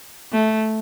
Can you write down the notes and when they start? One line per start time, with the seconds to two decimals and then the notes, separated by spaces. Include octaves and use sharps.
0.32 A3